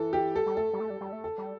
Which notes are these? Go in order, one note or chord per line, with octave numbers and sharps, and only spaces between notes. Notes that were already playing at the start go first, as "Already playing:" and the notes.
Already playing: E3 A4
G4
G3 A4
G3
A3 A4
G3
A3
G3
G3
A3
A4
G3